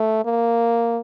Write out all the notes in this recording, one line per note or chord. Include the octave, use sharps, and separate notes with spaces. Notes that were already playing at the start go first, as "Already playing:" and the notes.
Already playing: A3
A#3